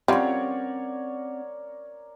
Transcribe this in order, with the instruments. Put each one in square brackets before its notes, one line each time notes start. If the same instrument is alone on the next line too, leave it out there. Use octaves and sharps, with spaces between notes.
[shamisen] G3 F4 [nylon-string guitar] C4 C#4 [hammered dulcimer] A#4 C#5 D5 [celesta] F#5